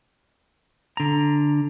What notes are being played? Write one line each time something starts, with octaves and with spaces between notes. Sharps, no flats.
D3 A#5